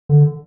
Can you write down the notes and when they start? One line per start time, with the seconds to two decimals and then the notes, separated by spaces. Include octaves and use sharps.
0.09 D3